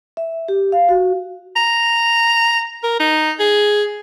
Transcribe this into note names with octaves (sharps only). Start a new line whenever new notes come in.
E5
G4
F5
F#4
A#5
A#4
D#4
G#4